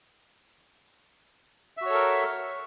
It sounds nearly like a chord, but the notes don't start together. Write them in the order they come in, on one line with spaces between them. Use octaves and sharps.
E5 F#4 C#5 A4 A#4